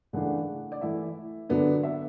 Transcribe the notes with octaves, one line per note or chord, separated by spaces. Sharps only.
C#3 E3 A3 D4 F#5
D5
E3 A3 E4 E5
D3 F#3 B3 D4
E5